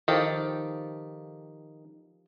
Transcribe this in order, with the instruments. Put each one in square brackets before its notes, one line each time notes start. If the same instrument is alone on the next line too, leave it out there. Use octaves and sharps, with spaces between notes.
[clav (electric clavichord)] D#3 [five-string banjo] F3 G4 A4